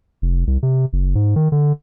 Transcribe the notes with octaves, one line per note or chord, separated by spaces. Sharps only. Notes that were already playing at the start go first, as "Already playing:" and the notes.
F1
C2
C3
F#1
G#2
D#3
D3